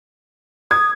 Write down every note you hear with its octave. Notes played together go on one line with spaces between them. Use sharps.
D#6 G#6